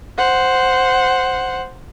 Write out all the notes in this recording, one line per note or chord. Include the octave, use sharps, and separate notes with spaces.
C5 F#5